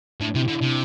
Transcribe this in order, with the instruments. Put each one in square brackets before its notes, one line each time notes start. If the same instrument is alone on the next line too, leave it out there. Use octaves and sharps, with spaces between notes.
[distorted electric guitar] A2 [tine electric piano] D4
[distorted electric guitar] C3 [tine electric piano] E4
[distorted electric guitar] D3 [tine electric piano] E4
[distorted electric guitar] C3 [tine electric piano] D4
[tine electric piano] C4